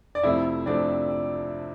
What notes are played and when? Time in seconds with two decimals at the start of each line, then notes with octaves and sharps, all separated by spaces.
0.15 D5
0.23 F2 C3 F3 A3 C4 E4 E5
0.66 F2 C3 F3 A3 C4 D4 D5